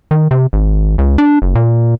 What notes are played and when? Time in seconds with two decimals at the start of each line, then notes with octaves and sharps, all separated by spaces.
0.11 D#3
0.31 C3
0.53 G#1
0.98 C#2
1.18 D4
1.42 F#1
1.55 A#2